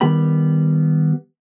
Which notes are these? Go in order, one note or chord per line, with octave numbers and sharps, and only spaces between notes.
D#3 G3 B3 G4 G5 B5